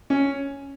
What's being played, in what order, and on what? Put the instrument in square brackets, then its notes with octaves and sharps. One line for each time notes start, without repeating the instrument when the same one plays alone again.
[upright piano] C#4